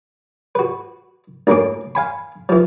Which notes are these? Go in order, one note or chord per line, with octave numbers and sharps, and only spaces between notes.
F#4 B4
D2 A2 A#3 C#4 D6
F5 G#5 B5
E3 F3